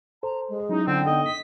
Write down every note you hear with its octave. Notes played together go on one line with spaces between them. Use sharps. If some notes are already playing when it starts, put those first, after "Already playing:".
A4 C5 A#5
G#3
F#3 C#4 D#4 E4
D3 C4 G5
B3 D#4 A4 D#5
B6